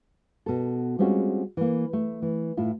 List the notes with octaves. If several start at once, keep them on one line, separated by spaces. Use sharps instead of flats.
B2 A4
G3 G#3 C4 C#4 F4 F#4
E3 A#3
A3
E3
A2 E4 F4